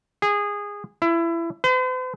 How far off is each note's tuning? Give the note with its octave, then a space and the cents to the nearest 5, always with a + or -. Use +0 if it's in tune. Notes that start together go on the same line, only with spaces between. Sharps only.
G#4 -20
E4 +25
C5 -45